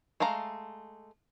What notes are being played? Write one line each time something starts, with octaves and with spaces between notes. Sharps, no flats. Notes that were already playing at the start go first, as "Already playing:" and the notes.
G#3 A3 F5 A#5